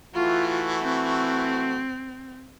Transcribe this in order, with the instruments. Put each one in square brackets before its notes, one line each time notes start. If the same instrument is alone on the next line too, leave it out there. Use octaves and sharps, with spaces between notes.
[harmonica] E3 A3 F#4 [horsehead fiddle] F4
[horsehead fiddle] C4